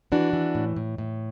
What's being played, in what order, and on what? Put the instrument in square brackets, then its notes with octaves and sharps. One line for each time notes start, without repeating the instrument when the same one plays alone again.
[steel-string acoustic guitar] E3 D4 F#4
E3
A2
A2
A2